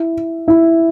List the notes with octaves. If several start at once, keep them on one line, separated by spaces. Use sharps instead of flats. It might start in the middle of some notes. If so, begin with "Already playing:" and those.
Already playing: E4
E4